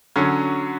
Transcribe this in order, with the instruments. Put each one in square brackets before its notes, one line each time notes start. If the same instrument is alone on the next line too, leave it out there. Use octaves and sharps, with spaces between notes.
[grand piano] D3 F#3 C#4